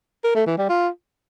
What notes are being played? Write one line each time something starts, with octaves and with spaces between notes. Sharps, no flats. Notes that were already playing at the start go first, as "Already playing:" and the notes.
A#4
A3
E3
G3
F4